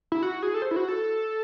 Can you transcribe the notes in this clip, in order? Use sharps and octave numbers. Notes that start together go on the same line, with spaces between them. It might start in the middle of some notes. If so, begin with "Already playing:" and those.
E4
F#4
G#4
A4
C5
E4
F#4
A4